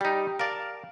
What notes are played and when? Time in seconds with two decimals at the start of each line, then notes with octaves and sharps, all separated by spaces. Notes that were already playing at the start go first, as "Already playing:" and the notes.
0.01 G3 D#4 G4
0.39 A#4 D5 F5 A5